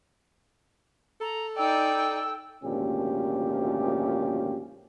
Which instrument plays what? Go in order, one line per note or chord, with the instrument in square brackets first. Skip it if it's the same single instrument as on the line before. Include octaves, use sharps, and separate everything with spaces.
[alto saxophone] A4 [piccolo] A#5
[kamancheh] D#4 D5 [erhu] G5 [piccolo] E6
[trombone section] G#1 D2 A#2 F3 C#4 G4